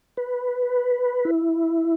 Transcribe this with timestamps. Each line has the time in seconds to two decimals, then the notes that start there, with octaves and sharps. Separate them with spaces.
0.17 B4
1.25 E4